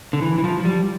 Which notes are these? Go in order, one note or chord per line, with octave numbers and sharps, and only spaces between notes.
D3
E3
E3
F3
F3
G3